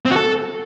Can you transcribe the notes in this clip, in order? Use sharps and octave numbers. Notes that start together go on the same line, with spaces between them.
C4
F#4
A4